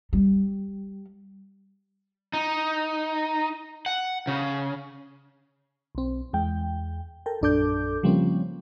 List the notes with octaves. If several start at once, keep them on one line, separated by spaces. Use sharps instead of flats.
G3
D#4
F#5
C#3
B1 C4
E2 G#3 G5
A4 A#4 G5
A#1 F#2 D4 A4 D6 G6
C#3 F3 G3 A#3 C4 C#4